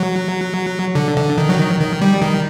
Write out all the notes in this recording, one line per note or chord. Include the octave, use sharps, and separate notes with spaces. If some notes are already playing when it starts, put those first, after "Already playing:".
Already playing: F#3
D3
D3
D#3
F#3
D#3
D#3
G3
D#3